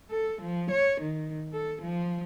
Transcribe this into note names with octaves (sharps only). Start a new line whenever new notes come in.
A4
F3
C#5
D#3
A4
F3